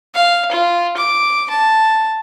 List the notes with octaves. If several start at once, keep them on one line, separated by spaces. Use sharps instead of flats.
F5
F4
D6
A5